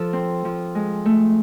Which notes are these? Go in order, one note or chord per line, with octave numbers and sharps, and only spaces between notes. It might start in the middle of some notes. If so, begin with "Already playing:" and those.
Already playing: F3 A4
C4
F3
G#3
A3